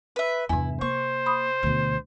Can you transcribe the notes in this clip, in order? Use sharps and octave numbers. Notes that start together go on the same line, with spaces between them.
B4 E5
E2 G2 C3 E4 G#5
A#3 C5 C#6
B5 D#6
D2 B2